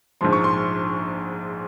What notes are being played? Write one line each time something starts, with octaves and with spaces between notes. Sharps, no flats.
A#1 G#2 F3 C6
C#6
C6